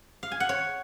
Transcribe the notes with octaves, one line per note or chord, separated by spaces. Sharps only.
F5
G#5
F#5
C#5